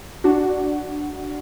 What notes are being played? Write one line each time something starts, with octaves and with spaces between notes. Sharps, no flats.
D4 F#4